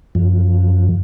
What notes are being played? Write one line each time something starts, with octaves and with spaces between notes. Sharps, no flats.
F#2 F3